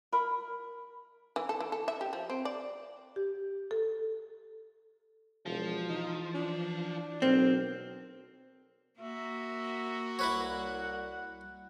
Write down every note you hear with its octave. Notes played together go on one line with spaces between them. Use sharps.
A#4 B5
E3
A4
E3
A4
E5
G4
F3
C4
D5
G4
A4
E1 F3
E3 D#4
D4
B1 C4 A#4
A#3 F#4 A#4 E5
C2 E4 B4 C#5 F#5